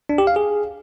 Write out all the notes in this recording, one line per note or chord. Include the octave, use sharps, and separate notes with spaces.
D4
G4
F5
G#4